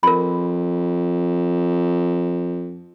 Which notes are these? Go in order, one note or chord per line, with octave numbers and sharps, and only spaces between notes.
F2 A#4 B5